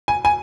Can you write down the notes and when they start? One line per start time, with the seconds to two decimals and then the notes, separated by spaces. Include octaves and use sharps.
0.08 G#5
0.25 G#5